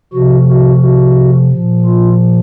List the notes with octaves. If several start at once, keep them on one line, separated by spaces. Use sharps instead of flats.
C3 F3 F#4
F#4
F#4
A#2 F3
F4